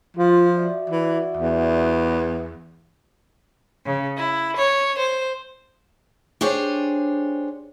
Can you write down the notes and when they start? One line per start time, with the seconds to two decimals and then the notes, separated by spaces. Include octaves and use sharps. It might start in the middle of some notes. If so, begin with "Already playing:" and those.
0.17 F3 F4
0.57 F#4 D5 E5
0.90 E3
1.37 E2
3.85 C#3
4.18 E4
4.57 C#5
5.00 C5
6.41 D4 G4 G#4 C5 C#5